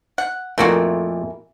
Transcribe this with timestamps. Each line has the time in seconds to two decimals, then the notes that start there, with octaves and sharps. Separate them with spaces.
0.18 F#5
0.58 F2 A#2 E3 A3 A#3 F#4